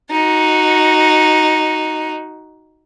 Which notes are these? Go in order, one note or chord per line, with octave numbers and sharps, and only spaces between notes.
D#4 F#4